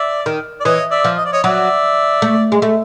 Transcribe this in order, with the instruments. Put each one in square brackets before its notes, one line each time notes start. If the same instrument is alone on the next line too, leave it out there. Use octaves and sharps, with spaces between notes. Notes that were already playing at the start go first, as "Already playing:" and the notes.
Already playing: [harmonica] D5 E5
[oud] D#3
[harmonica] D5
[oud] E3 [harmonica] C#5 D#5
[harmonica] D5 E5
[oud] F3
[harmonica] D#5
D5
C#5 D#5
[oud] F#3 [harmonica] D5 E5
[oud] A3
G#3
A3